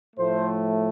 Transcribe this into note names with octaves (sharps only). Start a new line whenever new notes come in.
A2 F3 A3 C5